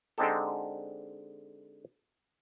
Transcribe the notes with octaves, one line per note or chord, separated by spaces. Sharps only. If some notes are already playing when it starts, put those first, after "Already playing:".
D3 G#3 C4 D#4 G4 A4